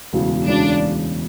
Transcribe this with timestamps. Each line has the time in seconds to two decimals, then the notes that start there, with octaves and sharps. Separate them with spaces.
0.13 E1 D2 C#3 E3 B3
0.46 E1 D2 C#3 E3 B3 D4